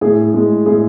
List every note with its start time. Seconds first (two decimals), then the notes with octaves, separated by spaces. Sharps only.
0.01 A2 G#4
0.34 G#3
0.66 A2 G#4